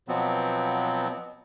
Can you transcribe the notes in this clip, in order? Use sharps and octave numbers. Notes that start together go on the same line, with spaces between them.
B2 F3 F#3 B3 C4